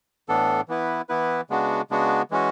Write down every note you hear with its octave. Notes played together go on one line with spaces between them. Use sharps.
A2 E3 B3 D4 A4
E3 B3 E4 B4
E3 B3 E4 B4
C#3 G#3 B3 D4 F#4
C#3 G#3 B3 D4 F#4
E3 G#3 C#4 F#4